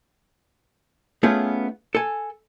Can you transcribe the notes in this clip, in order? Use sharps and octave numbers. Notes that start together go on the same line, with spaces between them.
A3 B3 C#4 F4 G#4
A4 G#5